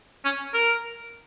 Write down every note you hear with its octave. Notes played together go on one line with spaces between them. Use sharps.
C#4
A#4